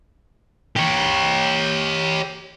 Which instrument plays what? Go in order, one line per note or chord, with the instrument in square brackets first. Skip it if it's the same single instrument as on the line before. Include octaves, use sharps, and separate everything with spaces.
[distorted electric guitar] G4 C#5